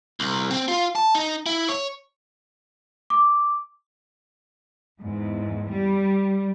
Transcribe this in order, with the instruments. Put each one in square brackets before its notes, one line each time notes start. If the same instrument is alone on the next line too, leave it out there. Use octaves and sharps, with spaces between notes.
[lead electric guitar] C2
C4
F4
A5
D#4
E4
C#5
[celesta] D6
[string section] E2 G#2
G3